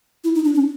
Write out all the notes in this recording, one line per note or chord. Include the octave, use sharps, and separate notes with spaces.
E4
D#4
D4
C#4